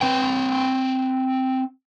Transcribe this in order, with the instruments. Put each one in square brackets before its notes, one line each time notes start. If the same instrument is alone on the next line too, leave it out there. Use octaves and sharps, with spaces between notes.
[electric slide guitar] C4 B4 G5